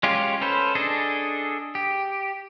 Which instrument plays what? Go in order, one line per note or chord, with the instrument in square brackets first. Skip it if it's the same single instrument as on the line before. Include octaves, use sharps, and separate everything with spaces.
[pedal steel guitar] G#3 C#4 F4 G4
C#4 A4 B4 C5
D4 G#4 A4 D#5
G4